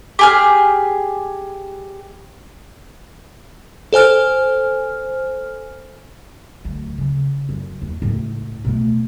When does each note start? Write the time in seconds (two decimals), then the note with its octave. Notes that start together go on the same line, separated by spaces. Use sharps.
0.19 G4 G#4 F6
3.93 A4 C5 G#5 F6
6.65 D2 F#3
6.98 C#3
7.49 F#2
7.82 D#2
8.02 C#2 A2
8.65 B2 A3